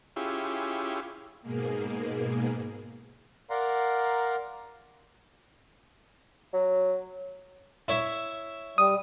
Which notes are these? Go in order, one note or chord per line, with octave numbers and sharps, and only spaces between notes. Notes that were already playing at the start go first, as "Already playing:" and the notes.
C#4 E4 F4 G4 G#4
G#2 B2 G#3 A#3
A#4 D5 F5 F#5 A#5 C6
F#3
E4 C#5 E5
G3 D#6